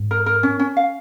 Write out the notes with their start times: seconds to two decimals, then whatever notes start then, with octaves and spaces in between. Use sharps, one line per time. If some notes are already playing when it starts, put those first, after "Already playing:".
Already playing: G#2
0.11 A#4
0.26 A#4
0.43 C#4
0.59 C#4
0.77 F5